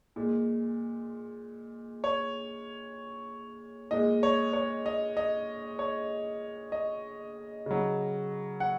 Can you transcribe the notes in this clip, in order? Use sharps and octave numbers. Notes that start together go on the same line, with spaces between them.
A#2 G#3
C#5
A#2 G#3 D#5
C#5
C#5
D#5
D#5
C#5
D#5
C#3 F#3
F#5